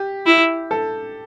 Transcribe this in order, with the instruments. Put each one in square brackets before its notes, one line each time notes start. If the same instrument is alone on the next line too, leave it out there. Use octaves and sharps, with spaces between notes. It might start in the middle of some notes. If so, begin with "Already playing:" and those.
Already playing: [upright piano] G4
[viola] E4
[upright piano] A4